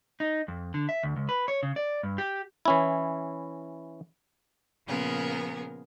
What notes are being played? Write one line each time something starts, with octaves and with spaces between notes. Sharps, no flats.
D#4
F2
D3
E5
D2
C#2
B4
C#5
C#3
D5
G2
G4
E3 C#4 E4
A#2 C#3 F3 B3 G#4 A#4